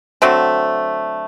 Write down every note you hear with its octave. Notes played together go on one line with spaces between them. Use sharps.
D3 F#3 A3 C4